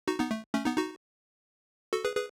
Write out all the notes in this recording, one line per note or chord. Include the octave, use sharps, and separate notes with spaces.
D#4 F#4
B3 D#4
A3
A3 C#4
B3 D#4
D#4 F#4
F#4 A4
G#4 B4
G#4 B4